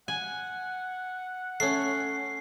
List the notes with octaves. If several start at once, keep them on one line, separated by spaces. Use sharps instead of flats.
F#5 G#5
A3 C#4 C7